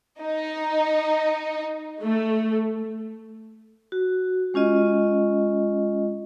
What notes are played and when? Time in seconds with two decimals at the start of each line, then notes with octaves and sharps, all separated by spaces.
0.20 D#4
2.01 A3
3.92 F#4
4.54 G#3 C#4 F4 D#5